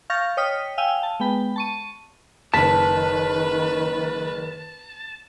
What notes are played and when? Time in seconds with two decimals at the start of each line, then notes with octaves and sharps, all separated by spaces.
0.10 F5 C#6 F6 G6 A6 A#6
0.37 C#5 D#5 G5 D#6 F6 B6
0.78 F5 G5 G#5 E6 D#7
1.03 A5
1.20 G#3 B3 G5 B5
1.56 A5 C#6 D#7
2.54 F#1 D#3 B4 A5 B6